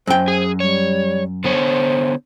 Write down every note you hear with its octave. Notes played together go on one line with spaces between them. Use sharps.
F#2 C5 G5
G#4
G3 C#5
D3 B3 C5 C#5